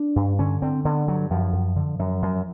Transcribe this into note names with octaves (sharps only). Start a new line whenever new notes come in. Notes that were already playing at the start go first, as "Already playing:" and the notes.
Already playing: D4
G2
D3 C#4
D3 C4
D3 B3
G2 F#3
F#2 F3
F#2
D3
F#2
F#2